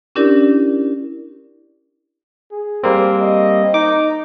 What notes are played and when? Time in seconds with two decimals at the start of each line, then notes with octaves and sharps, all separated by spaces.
0.15 C#4 D4 E4 G4 A#4 D5
2.52 G#4
2.83 G3 A#3 C4
3.21 D#5
3.74 D#4 D6